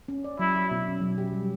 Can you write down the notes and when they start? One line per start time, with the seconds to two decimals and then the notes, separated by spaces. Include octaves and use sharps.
0.08 C#4
0.24 D5
0.39 F#3 E4
0.55 F#3
0.71 B2
0.87 C#4
1.02 F#3
1.18 G4
1.33 G3